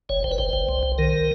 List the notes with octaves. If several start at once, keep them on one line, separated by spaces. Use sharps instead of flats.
G1 C#5
G1 C5
B4
G1 C5
G1
C2
C2
D#3 A#4